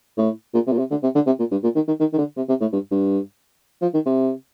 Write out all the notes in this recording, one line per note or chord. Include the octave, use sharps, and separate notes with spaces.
A2
A#2
C3
A#2
C3
D3
C3
D3
C3
A#2
G2
A#2
D#3
D#3
D#3
D#3
D3
C3
C3
A2
G2
G2
F3
D#3
C3